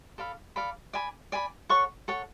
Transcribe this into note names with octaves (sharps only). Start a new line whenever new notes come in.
A4 D5 F5 B5
A4 D5 F5 B5
D5 G#5 B5
D5 G#5 B5
A4 C#5 F#5 C#6
A4 C#5 F#5 C#6